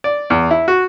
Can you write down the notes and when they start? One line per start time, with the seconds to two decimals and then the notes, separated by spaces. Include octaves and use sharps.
0.04 D5
0.30 E2
0.51 E4
0.68 F#4